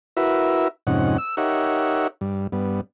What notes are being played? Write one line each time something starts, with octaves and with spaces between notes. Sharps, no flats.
E4 F#4 A#4 B4 E5
F2 G#2 C3 C#4 D#4 F#5
E6
D#4 G4 A#4 C#5 E5 F#5
G2
G2 B3